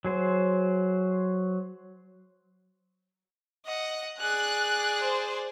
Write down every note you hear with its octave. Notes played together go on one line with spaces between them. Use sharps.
F#3 G#4 C5
D#5 F#5
G#4 D5 F#6
C5